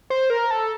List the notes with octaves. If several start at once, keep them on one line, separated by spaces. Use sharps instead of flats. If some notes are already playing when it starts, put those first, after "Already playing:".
C5
A#4
A4